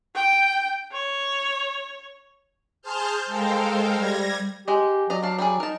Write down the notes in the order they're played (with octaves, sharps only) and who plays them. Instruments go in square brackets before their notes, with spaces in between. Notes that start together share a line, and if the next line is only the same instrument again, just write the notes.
[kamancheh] G5
C#5
[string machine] G#4 C5 A5 C6 F6 G6
G#3 A4 A#4 C5 F5 G5
G3 G#6 A#6
[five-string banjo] G#3 D#5 [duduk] G4
[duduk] F#3 [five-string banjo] D5 D#5 A#5
[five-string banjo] D4 F5 A5
G3 D4 G#4
[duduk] D#4 [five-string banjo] A#4 A5